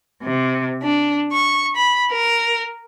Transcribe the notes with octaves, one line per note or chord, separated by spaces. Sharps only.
C3
D4
C#6
B5
A#4